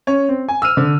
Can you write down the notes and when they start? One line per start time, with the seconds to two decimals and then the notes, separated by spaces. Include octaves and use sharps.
0.07 C#4 C#5
0.29 C4
0.49 G#5
0.62 E6 F6 D#7
0.77 D3